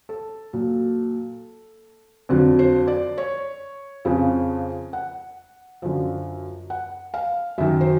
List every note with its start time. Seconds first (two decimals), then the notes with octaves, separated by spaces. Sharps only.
0.09 A4
0.53 A#2 F#3
2.29 F2 D3 F#3
2.59 C5
2.88 D5
3.18 C#5
4.05 F2 C#3 F3
4.93 F#5
5.82 F#2 D3 F3
6.70 F#5
7.14 F5
7.58 F#2 D#3 F#3 E5
7.81 C5